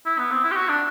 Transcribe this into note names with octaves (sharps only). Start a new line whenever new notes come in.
E4
B3
C4
E4
G4
F#4
D4